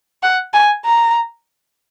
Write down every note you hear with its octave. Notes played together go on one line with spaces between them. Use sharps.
F#5
G#5
A#5